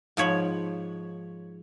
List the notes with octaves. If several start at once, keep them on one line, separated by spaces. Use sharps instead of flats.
G#2 F3 C#5 B5